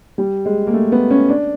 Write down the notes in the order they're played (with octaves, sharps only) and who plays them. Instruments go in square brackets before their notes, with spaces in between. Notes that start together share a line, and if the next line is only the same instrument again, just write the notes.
[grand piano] G3
G#3
A#3
A3
B3
C#4
D4